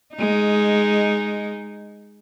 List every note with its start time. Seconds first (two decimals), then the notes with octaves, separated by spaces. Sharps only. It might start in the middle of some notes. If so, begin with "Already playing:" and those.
0.15 G#3 D#4